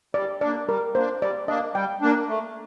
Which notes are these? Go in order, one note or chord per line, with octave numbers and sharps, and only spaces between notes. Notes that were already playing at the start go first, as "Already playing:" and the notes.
G3 D5
A#3 D4 D5
G3 A#4
A#3 D4 C5
G3 D5
A#3 D4 D#5
G3 G5
A#3 D4
A3